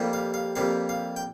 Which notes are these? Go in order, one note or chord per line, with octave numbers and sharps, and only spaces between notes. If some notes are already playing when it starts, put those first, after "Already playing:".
Already playing: F2 C3 G3 A#3
F5
F5
F2 C3 G3 A#3 F5
F5
G5